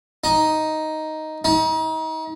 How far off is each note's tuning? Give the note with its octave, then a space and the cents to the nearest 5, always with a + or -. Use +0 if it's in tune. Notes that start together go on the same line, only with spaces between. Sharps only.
D#4 +5
D#4 +35